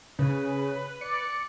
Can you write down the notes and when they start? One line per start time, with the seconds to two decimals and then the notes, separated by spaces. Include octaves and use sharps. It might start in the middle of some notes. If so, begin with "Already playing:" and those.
0.19 C#3 B4
1.01 D5 C#7